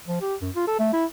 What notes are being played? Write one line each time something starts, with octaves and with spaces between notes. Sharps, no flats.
F3
G4
F#2
F4
A4
A3
E4